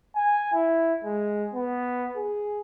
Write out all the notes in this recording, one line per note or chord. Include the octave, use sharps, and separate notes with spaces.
G#5
E4
G#3
B3
G#4